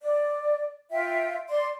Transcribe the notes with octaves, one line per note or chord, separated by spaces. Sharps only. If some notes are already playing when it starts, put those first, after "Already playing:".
D5
F4 E5 G5
D5 C6